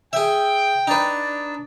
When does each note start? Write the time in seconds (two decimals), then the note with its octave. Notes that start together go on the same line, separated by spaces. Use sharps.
0.13 G#4 E5 G5
0.87 D4 D#4 B4